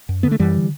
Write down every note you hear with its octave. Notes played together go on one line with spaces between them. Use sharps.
F#2
D3 B3
A3
F#2 E3 G3
D3